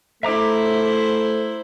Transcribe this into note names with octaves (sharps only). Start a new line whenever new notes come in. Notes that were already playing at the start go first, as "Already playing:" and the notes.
A3 E4 C5 E5 A#5 D6